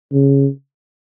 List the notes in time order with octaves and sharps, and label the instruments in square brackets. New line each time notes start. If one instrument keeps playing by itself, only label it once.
[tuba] C#3